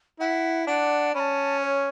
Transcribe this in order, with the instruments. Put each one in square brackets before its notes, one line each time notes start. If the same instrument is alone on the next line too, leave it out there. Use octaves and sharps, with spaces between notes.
[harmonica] E4 [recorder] F#5
[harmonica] D4 [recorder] F#5
[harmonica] C#4 [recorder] B5
[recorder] A5
C#5